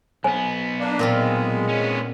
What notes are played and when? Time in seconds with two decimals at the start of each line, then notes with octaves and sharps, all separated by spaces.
0.24 B1 B3 C5 G#5
0.79 A#3 D4
0.99 A#2 C4 F4
1.14 G#3
1.69 B3 C#4